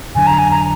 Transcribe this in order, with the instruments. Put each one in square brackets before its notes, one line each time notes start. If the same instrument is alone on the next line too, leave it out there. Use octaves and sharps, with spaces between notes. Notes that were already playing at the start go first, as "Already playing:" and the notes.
[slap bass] F2 D3 F#3 D4 [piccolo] G#5
[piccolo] A#5
G#5
A#5